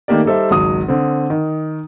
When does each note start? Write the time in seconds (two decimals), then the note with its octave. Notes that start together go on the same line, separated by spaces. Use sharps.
0.08 D#3 A3 A#3 G4 A#4 D5
0.25 G3 D#4 A4 C5 E5
0.50 G#1 C#2 F#3 D#6
0.88 D3 C4
1.30 D#3